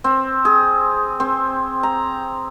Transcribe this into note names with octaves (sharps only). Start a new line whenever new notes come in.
C4
G#4
C4
A#5